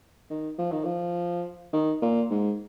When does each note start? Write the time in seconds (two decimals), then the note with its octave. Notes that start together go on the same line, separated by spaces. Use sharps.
0.30 D#3
0.58 F3
0.72 D#3
0.84 F3
1.73 D#3
2.02 A#2
2.30 G#2